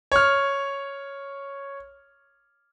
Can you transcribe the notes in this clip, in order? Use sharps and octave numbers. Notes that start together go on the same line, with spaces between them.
C#5 F6